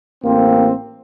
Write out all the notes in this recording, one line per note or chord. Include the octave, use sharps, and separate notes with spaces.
A1 A#3 C4